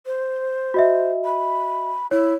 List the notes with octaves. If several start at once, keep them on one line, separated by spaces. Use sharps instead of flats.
C5
F#4 D#5 E5
B5
E4 C#5